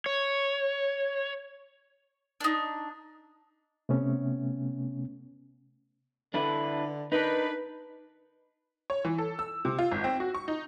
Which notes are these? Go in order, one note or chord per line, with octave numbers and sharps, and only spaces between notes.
C#5
D4 D#4
C3 A3 B3 C#4
D3 D4 E4 B4
D4 D#4 A#4 B4
C#5
E3
A4
E6
C3
F4
G#1
C4
F#4
C#6
D#4